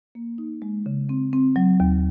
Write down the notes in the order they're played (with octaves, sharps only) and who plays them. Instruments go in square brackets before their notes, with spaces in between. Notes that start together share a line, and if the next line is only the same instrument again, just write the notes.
[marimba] A#3
D#4
G#3
C#3
C4
C4
F#3
D#2